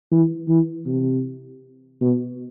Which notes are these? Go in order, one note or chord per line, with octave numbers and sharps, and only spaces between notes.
E3
E3
C3
B2